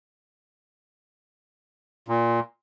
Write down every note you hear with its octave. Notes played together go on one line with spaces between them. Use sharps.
A#2